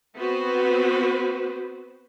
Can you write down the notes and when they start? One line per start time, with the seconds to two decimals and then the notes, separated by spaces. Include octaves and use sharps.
0.17 B3 C4 F#4 B4 C5